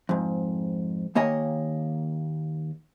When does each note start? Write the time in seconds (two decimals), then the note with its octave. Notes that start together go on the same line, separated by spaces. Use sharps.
0.09 F2 G#2
1.15 D#2 A#3 C#5 D#5 G#5